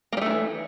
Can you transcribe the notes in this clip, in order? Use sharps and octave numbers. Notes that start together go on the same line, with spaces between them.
D#3 E3 G3 A3 A#3